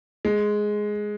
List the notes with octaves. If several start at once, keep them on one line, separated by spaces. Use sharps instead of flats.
G#3